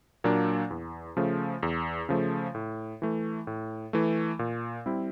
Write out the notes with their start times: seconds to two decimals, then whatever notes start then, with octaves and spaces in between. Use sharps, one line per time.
0.24 A#2 F#3 A#3 D4
0.71 E2
1.17 C#3 F3 A3
1.63 E2
2.09 C#3 F3 A3
2.55 A2
3.02 E3 A3
3.47 A2
3.93 E3 A3
4.39 A#2
4.86 G3 C4 E4